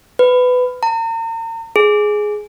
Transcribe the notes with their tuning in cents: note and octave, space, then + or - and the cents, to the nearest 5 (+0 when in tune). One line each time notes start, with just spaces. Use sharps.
B4 +20
A#5 -40
G#4 +10